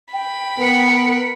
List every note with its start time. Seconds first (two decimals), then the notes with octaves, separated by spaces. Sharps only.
0.13 G5 B5
0.59 B3 A#4 F#5